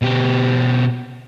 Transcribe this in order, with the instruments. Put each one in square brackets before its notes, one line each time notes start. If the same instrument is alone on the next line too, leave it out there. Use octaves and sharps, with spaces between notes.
[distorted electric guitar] B2 G4